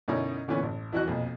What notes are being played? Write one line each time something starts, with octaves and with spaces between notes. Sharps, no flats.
F#2 B2 D3 C#4 D#4 E4
A#2 D3 E3 B3 C#4
A1
F2 E3 E4 F#4 D#5 F#6
B1 F2 A#2